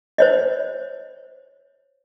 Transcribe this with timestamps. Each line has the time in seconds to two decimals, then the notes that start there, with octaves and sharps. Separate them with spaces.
0.18 C5 C#5 D#5